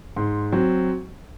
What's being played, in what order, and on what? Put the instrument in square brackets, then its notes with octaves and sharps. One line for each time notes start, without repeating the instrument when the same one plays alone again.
[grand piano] G#2 C6
F#3 C4